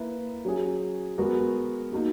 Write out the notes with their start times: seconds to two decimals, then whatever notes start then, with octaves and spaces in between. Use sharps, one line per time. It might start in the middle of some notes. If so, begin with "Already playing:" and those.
Already playing: A#3 E4 B4
0.45 F#3 C#4 G#4
1.18 G#3 B3 F#4 A#4
1.92 A#3 D#4 F#4